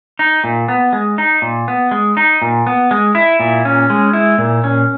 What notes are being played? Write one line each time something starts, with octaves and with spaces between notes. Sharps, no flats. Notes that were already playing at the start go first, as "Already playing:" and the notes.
D#4
A#2
B3
G#3
D#4
A#2
B3
G#3
D#4
A#2
B3
G#3
E4
A#2
C#4
G#3
E4
A#2
C#4